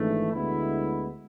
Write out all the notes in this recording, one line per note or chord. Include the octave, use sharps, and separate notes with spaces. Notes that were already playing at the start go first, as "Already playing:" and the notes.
Already playing: G#1 G#2 E3 A3 D4
D2 D3 G#3 B3 E4